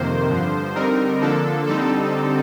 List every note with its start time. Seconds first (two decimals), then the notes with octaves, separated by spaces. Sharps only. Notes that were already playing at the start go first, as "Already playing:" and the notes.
Already playing: F2 C3 D#3 A#3 C5
0.29 G2 D3 F3
0.75 D3 G3 C4 D#4 A#4
1.21 D3 F3 A#3 D4 A4
1.67 D3 G3 C4 D#4 A4